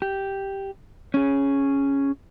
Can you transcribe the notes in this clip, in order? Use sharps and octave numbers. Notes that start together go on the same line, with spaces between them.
G4
C#4 G#4